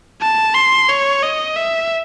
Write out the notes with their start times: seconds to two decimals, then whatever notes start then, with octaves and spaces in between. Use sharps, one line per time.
0.22 A5
0.55 C6
0.89 C#5
1.22 D#5
1.56 E5